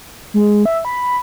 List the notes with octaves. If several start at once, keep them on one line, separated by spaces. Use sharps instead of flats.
G#3
E5
B5